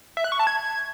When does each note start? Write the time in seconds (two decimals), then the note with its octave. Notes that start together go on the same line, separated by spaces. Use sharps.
0.17 E5
0.24 F#6
0.32 C#6
0.39 A5
0.47 G#6